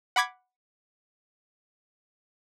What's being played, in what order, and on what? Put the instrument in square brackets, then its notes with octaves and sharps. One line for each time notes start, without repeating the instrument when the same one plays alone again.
[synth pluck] F#5 B5 D6 G#6 B6